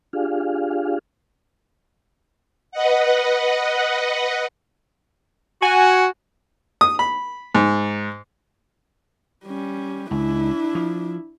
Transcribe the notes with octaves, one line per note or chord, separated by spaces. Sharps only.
D4 F4 G4 G#4 F5
B4 D#5 F#5
F#4 G#5
D#6
B5
G#2
G3 C#4
C#2 D4 E4
F3